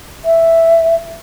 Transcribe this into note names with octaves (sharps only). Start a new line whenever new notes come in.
E5